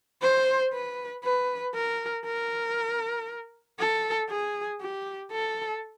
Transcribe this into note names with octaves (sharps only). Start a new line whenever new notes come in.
C5
B4
B4
A#4
A#4
A4
G#4
G4
A4